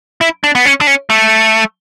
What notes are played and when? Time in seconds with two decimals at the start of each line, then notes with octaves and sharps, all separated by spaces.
0.21 E4
0.44 D4
0.55 B3
0.65 C#4
0.81 D4
0.87 C#4
1.10 A3